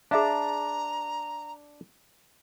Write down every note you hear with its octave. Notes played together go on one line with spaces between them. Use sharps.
D4 G#4 E5 F5 A5 A#5